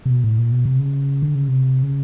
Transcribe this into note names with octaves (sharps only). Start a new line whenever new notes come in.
C3
B2
A2
A#2
B2
C3
C#3
D3
C#3
C3
C#3